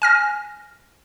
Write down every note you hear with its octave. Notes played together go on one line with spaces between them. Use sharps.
G#5 F6 A#6